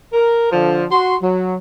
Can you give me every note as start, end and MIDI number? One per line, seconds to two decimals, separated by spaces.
0.13 0.50 70
0.52 0.84 50
0.52 0.84 53
0.90 1.16 66
0.90 1.16 84
1.21 1.55 54